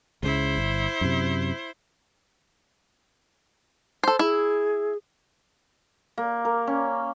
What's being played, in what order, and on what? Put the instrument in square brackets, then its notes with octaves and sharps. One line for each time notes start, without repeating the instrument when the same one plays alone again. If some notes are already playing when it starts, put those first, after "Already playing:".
[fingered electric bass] C#2 C#3 [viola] E4 C5
[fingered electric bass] G1
F#2 C3
[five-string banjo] A4 C5
[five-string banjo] E4 [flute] G#4
[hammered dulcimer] A#3
A#4
C#4